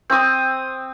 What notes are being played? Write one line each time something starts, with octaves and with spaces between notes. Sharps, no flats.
C4 D#6